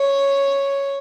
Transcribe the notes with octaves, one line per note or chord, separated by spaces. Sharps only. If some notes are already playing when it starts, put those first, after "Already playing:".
Already playing: C#5